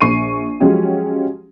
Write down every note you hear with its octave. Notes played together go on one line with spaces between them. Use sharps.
A#1 C#6 C7 D#7
F3 F#3 G#3 C#4 F#4 G4